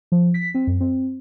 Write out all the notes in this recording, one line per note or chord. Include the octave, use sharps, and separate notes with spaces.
F3
B6
C4
F#2
C4